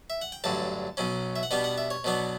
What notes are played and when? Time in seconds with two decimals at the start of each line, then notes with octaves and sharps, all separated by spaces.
0.10 E5
0.22 F#5
0.32 G5
0.44 A1 G2 D3 F#3 A5
0.97 B1 B2 F#3 C#4
1.36 E5
1.43 F#5
1.51 B2 G3 B3 D4 G5
1.64 F#5
1.78 E5
1.91 C#5
2.04 B2 F#3 B3 D4